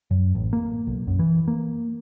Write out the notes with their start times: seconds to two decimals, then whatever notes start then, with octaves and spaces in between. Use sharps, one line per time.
0.11 F#2
0.35 A1
0.53 A#3
0.87 B1
1.07 F#2
1.19 E3
1.48 A#3